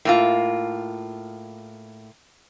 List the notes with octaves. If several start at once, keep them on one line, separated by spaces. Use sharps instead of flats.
A2 A#3 F4